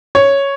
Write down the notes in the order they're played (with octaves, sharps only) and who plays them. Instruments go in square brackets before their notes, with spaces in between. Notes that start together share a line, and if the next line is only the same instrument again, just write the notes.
[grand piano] C#5